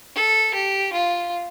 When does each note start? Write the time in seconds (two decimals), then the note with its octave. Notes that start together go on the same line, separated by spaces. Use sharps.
0.16 A4
0.54 G4
0.92 F4